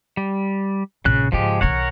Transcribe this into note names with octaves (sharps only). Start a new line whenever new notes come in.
G3
A#1 G2 C#3 F#6
G#2 C#3 F3 G#3 G4
B1 D#3 A#4 C#5 F#5